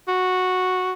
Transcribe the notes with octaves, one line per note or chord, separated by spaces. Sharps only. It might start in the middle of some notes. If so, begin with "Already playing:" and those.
F#4